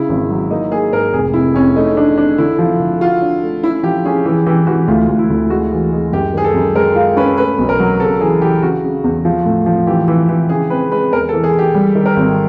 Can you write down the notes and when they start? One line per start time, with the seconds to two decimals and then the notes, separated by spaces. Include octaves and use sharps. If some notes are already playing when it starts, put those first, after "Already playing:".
Already playing: C#3 E4
0.09 G#1
0.30 F#3
0.50 A#3 D#4
0.71 A#3 G#4
0.93 G#2 A#4
1.13 F1 G#4
1.33 C3 E4
1.54 F2 C#4
1.76 A3 D#4
1.97 D4
2.18 D4
2.38 D3 E4
2.59 F3
2.80 D3
3.00 F4 F#4
3.21 D4
3.42 A3
3.63 C#4 E4
3.83 F3 G4
4.05 C#4 G#4
4.25 E3 G#4
4.46 E3 G4
4.67 E3 F#4
4.88 D2 F4
5.09 D2
5.19 E4
5.30 D2
5.50 G#3 F#4
5.72 E3
5.93 G#3
6.13 F#2 G4
6.34 D#3 G#4
6.44 A4
6.54 F#2
6.75 G#3 A#4
6.96 F4
7.17 C#4 B4
7.37 A3 B4
7.59 B1
7.69 A#4
7.80 F#3
8.00 C#3 A4
8.21 E3 G#4
8.41 E3 G4
8.63 C#3 F#4
8.84 C#3
9.04 E2
9.25 F3
9.45 A2
9.66 F3
9.87 E3 G4
10.08 E3
10.29 E3
10.49 C#3 G#4
10.70 C4 B4
10.91 G#3 B4
11.13 E2 A#4
11.29 A4
11.34 E3
11.44 G#4
11.54 E3 G4
11.75 G3
11.95 D#3
12.06 A#4
12.17 G#1